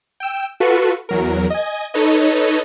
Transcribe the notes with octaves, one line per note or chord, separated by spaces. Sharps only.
G5 E6
F4 F#4 A4 B4 C#6
E2 F#3 A#4
D#5 G#5
D#4 A4 B4 C#5 D#5